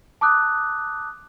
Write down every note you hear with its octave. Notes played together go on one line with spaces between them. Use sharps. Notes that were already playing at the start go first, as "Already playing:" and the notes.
A5 D6 D#6 F#6